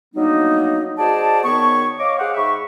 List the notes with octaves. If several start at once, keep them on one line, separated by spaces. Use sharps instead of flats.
F#3 G3 A#3 B3 D4 D#4
F#4 G#4 C5 D5 D#5 A5
D#3 B3 C#5 C#6
C#5 D#5 F5 D6
G#4 C5 F5 F#5
G#2 E5 B5 C#6